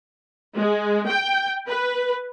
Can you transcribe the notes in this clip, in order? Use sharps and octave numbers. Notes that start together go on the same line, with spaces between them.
G#3
G5
B4